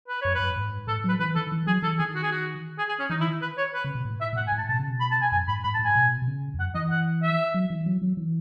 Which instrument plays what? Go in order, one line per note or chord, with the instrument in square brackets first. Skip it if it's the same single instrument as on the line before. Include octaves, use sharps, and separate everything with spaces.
[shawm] B4
[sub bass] F#2 [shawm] C#5
[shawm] B4
[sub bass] F#2
G#2
[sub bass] A2 [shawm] A4
[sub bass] F#3 [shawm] B4
[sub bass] E3 [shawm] B4
[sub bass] D#3 [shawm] A4
[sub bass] E3
[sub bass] F#3 [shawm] G#4
[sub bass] E3 [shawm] A4
[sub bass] D#3 [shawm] G#4
[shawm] F#4
G#4
F#4
G#4
G#4
C#4
[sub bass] E3 [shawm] D#4
[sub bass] D#3 [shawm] E4
[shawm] B4
C#5
B4
[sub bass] C#3
B2
A2
[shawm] E5
[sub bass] B2
[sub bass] A2 [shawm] F#5
[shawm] G#5
[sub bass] A2
[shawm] A5
[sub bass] B2 [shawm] A5
[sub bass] C#3
B2
[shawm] B5
A5
G#5
[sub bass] F#2 [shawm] G#5
[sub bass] G#2 [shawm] B5
[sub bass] G#2 [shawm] B5
[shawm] A5
[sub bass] A2
[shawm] G#5
[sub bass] B2
B2
C#3
E2
[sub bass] F#2 [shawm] F#5
[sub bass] E3 [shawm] D#5
[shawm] F#5
E5
[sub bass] F#3
E3
F#3
F#3
E3